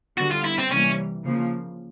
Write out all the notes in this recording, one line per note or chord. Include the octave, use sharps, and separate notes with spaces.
D3 G3 B3 F#4
F4
E4
C4
C3 E3 G3 A#3 C#4
C#3 F3 A#3